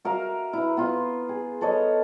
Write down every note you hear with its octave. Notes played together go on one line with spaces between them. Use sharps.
F#4 A#4 E5 F5
E4 B4
B3 F4 C6
G#4
A4 B4 C#5 D#5